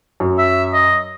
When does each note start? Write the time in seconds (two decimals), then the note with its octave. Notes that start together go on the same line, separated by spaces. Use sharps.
0.20 F#2
0.39 E5
0.73 D#5